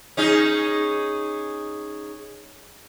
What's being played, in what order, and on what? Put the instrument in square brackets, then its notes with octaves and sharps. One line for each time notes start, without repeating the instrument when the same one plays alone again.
[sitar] C#4 D#4 G#4